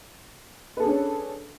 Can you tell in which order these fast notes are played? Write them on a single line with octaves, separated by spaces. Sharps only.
B4 A4 G#4 D4 C#4